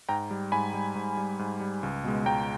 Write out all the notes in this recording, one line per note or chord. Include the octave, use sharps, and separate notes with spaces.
G#2 G5 A#5
G3
G#2 G#5 B5
G3
G#2
G3
G#2
G3
C#2
B2 G#3
C#2 G5 A#5